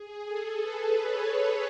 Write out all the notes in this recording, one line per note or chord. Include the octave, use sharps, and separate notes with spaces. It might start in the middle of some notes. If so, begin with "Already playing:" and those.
Already playing: G#4
A4
B4
C#5